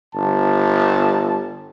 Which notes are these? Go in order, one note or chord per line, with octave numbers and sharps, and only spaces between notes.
G1 A5